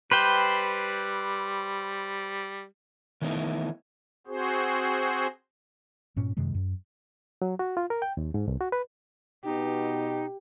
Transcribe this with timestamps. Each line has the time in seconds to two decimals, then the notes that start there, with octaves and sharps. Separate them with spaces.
0.11 G3 B4 C5 G5
3.22 D#3 E3 A3 B3 D#4 E4
4.27 C4 F#4 G#4 C5
6.16 G2 A#2 C#4
6.37 F#2 C3 D#3 G#3
6.54 F#2
7.42 F#3
7.59 F#4
7.77 F4
7.90 A#4
8.02 G5
8.17 D#2
8.34 G#2
8.48 C2
8.61 F#4
8.72 B4
9.45 B2 D#4 G4